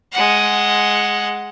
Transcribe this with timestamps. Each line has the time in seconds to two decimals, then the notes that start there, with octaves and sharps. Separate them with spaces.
0.12 G#3 F#5